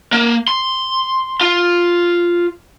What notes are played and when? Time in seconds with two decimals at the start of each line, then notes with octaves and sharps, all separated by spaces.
0.13 A#3
0.48 C6
1.41 F4